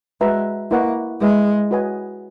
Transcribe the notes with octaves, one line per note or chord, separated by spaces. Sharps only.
G#3 F#4 B4 E5 A#5
A#3 E4 B4 D#5 F#5 C#6
G#3 E4 B4 E5 B5
F#4 B4 D#5 G#5